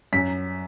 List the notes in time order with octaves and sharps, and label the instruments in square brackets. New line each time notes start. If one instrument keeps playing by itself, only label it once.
[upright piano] F#2 B6